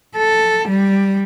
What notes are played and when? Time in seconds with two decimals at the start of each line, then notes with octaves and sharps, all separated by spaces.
0.17 A4
0.69 G3